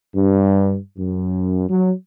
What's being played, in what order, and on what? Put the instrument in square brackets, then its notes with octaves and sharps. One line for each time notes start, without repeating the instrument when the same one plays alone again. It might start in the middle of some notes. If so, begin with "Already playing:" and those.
[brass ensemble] G2
F#2
F#3